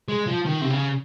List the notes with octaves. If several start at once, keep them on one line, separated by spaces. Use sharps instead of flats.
G#3
F3
D#3
C3
C#3